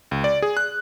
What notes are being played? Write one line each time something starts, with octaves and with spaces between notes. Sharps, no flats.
C#2
D5
G#4
F#6